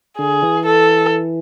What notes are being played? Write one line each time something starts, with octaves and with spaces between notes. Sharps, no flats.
D3 G#4
E3
A4